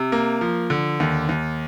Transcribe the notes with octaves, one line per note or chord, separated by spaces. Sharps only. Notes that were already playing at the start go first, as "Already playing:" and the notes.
Already playing: C3
A#3
F3
D3
D#2
D#2